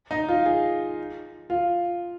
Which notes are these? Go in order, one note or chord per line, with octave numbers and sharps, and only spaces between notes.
D#4
F4
G#4
F4